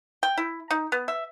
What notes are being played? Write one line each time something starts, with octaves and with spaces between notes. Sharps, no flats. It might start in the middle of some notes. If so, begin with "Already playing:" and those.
G5
E4
D#4
B3
E5